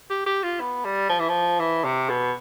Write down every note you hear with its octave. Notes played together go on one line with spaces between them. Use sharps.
G4
G4
F4
B3
G3
F3
E3
F3
E3
C3
B2